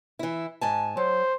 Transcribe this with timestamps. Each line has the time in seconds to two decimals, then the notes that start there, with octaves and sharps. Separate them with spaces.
0.19 E3 E4
0.61 G#2 G#5 A5
0.97 F#3 C5